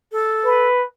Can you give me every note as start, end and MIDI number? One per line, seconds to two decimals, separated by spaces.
0.12 0.68 69
0.45 0.85 71